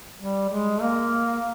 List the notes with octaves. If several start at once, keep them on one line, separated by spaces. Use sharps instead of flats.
G3
G#3
A#3